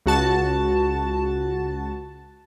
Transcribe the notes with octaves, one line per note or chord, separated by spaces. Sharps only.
C#2 F#4 A5